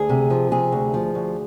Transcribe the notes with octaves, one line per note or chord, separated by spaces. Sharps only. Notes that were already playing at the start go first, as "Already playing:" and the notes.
Already playing: D2 G#4
C3
F3
C3 G#4
D2
F3
D2